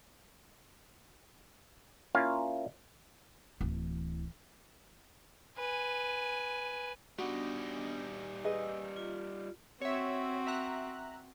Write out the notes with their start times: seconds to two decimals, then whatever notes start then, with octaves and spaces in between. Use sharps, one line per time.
2.15 A#3 C#4 E4 F4 F5
3.61 D1 E3
5.58 B4 G#5
7.18 G3 B3 D4 D#4 F#4 D#6
8.44 G#4 B4 D#5 G#5 E6
8.96 F4
9.82 C4 F#4 C#5 E5
10.47 E5 A#5 F#6